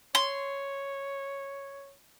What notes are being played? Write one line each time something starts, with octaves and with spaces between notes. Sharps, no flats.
C#5 C6